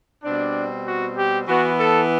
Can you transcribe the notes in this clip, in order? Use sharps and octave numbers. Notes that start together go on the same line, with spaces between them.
B2 G3 C4 D4
F#4
G4
E3 B3 F#4
A4